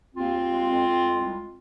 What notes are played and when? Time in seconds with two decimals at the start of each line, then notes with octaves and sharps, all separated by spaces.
0.16 D#2 C4 F4
0.33 D#2
0.51 G#3
0.68 F2
0.85 F2
1.02 G#3
1.20 C2